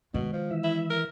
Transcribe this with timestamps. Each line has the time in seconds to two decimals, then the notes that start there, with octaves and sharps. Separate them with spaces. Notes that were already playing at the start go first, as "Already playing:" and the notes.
0.14 B2 D#3 G#3
0.33 F3
0.51 E3 E5
0.64 E4
0.90 A#4